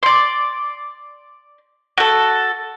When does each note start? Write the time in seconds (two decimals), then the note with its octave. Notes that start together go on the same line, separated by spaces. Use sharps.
0.03 D5 C6
1.98 F#4 A4